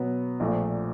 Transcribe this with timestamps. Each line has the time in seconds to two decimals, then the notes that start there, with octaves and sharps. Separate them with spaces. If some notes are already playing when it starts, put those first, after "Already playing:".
Already playing: B2 F#3 B3
0.40 A#1 A#2 F3 A3